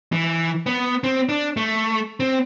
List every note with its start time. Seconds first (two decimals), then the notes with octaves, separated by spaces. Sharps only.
0.12 E3
0.66 B3
1.04 C4
1.29 D4
1.57 A3
2.20 C4